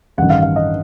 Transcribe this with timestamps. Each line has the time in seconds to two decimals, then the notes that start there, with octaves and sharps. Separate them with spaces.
0.17 A1 G2 D#3 F#5
0.30 F5
0.43 F5
0.56 D#5